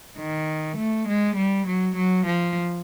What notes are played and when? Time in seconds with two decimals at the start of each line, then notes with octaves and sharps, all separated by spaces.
0.16 D#3
0.76 A3
1.06 G#3
1.35 G3
1.65 F#3
1.95 F#3
2.25 F3